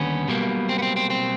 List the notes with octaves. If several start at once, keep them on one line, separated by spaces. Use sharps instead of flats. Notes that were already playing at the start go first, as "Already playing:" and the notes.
Already playing: D#2 D3 G3 B3 C#4
B1 B2 G3 A#3
C4
B3
C4
C4
C4